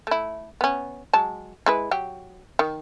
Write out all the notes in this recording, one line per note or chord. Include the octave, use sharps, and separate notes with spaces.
A3 E4
B3 C#4
F#3 G#3 A5
G#3 E4 B4
F#3 G4
D#3